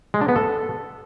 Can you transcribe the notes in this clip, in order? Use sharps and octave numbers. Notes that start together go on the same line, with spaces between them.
G#3
D4
B3
A4